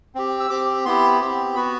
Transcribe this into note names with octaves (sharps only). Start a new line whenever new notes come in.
C4 G4
E6
C4 G4 D6
B3 E4 G4 C6
C4 G4
B3 F#4 B5